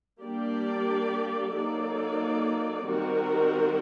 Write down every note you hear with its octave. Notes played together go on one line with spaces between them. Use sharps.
G3 A#3 D4 G4 D5
F#3 A#3 D#4 A4 D5
D#3 G3 C4 F#4 A#4